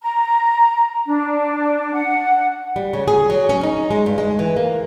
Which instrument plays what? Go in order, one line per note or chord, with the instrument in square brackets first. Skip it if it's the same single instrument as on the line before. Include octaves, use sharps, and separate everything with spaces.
[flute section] A#5
D4
F#5
[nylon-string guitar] G3
C#3
G#4
F#3
C#4
D#4
G#3
G2
G#3
E3
A#3